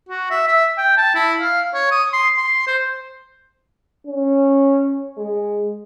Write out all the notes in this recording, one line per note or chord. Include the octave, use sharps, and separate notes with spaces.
F#4
E5
E5
G5
A5
E4
F5
C#5
D#6
C6
C6
C5
C#4
G#3